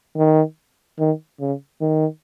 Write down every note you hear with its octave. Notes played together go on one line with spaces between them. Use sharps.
D#3
D#3
C#3
D#3